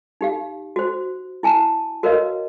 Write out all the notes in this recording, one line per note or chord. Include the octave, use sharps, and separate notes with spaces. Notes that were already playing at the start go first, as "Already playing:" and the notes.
D#4 G4 F5
F#4 C5
E4 G#5 A5
F#4 A#4 B4 C#5 D#5 F5